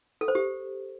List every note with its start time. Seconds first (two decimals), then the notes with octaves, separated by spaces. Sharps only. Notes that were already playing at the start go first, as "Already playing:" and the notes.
0.21 A4
0.28 C5
0.35 G4